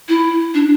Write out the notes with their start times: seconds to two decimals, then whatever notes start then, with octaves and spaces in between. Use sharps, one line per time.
0.09 E4
0.54 D4